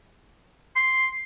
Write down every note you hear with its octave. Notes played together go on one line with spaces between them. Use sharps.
C6